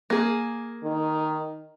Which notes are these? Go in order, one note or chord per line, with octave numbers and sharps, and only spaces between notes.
A#3 G#4
D#3